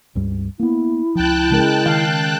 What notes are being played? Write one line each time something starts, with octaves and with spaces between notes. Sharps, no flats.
C#2 G2 G3
A#3 B3 E4
C#2 F3 G5 A5 F#6
C#3 G#3 A#4
D#3 F5